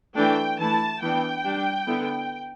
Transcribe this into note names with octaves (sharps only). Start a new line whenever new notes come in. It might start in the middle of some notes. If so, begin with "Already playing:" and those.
E3 A3 D4 G5
E3 A3 E4 A5
E3 B3 D4 G5
G3 D4
D3 B3 E4